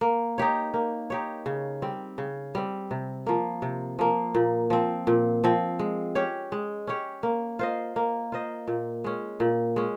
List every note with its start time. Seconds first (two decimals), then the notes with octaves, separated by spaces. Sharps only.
0.01 A#3
0.38 D#4 G4 C#5
0.74 A#3
1.10 D#4 G4 C#5
1.46 C#3
1.82 G3 C4
2.18 C#3
2.55 G3 C4
2.91 C3
3.26 F3 A#3
3.62 C3
3.99 F3 A#3
4.35 A#2
4.70 F3 C4
5.07 A#2
5.44 F3 C4
5.79 G#3
6.15 C#4 G4 C#5
6.52 G#3
6.87 C#4 G4 C#5
7.23 A#3
7.59 F4 C5 D#5
7.96 A#3
8.32 F4 C5 D#5
8.67 A#2
9.04 G#3 C#4
9.40 A#2
9.76 G#3 C#4